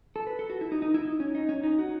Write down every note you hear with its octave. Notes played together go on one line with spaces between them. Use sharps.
A4
B4
A4
F#4
E4
D#4
D#4
E4
D#4
C#4
D#4
C#4
D#4
F#4